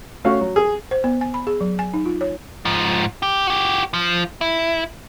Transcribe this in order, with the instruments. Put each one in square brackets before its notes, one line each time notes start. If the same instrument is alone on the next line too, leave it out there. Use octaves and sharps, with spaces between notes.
[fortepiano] A3 C#4 F#4 F5
F#3
G#4
[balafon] C5
B3
G#5
B5
G#4
F#3
G#5
D#4
F4
C#5
[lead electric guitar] G#2 F3
G4
F#4 G4
F3
E4